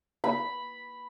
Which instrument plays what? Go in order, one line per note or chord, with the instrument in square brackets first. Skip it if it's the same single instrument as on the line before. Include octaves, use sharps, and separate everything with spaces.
[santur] B5